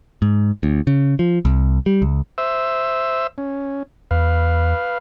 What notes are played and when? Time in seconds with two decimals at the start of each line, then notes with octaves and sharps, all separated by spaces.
0.22 G#2
0.63 D2
0.87 C#3
1.19 F3
1.45 C2
1.86 G3
2.02 C#2
2.38 C5 E5 E6
3.38 C#4
4.11 E2 B4 F5